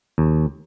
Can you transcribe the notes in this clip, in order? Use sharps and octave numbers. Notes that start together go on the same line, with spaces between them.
D#2